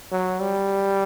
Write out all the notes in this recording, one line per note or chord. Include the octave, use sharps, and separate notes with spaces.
F#3
G3